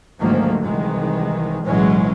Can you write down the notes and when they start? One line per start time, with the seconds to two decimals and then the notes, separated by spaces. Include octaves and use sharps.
0.20 D2 G#2 D#3 F3 F#3 A#3
0.64 C2 D#3 E3 G#3
1.63 B1 A2 E3 F#3 G#3 C#4